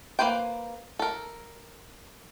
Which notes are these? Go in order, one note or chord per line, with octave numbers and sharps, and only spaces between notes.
A#3 D#4 B4 C5 G5
A4 A#4